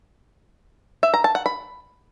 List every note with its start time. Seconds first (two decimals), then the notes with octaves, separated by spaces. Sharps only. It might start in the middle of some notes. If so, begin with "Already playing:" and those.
1.03 E5
1.14 A#5
1.24 A5
1.35 F#5
1.46 B5